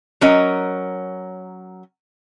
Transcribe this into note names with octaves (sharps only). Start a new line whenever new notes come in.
F#3 C#4 A#4 D#5